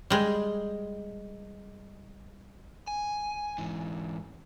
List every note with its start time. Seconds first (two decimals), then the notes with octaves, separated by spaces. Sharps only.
0.10 G3 G#3
2.88 G#5
3.58 G#2 E3